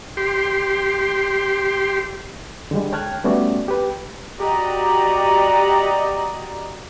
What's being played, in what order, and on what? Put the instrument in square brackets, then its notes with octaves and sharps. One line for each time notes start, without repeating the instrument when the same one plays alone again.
[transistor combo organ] G4 C6
[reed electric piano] D3 G3 G#3
C#5 G5 A5 F6 F#6 G#6
G3 A3 B3 C#4 F#4 D5
G4 B4
[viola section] F#4 G4 D5 D#5 A#5